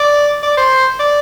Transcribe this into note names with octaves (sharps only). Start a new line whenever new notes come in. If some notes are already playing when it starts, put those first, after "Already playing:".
Already playing: D5
D5
C5
D5